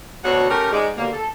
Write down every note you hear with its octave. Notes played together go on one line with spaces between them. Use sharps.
D2 B2 F#4 A4 C#5 F#5
A3 C#4 G4 A#4
G#2 G#3 D5
D#2 B2 D3 A#3
A4